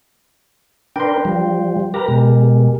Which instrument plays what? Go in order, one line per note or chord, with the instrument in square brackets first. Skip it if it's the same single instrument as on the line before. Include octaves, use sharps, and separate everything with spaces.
[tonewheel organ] D4 A#4 B4 [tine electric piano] G5 C6
[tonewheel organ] F3 G3
[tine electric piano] G4 A#4 [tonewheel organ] B4 A#5
[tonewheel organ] B2 G#3